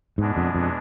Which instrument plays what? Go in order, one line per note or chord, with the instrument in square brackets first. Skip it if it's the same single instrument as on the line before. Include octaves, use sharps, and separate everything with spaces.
[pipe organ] E2 B2 G#3 B3 D4 [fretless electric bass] G#2
[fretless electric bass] F2
F2